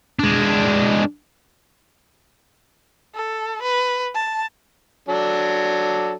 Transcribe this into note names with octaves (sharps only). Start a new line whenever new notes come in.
G#3 D4
A4
B4
A5
F#3 D4 A4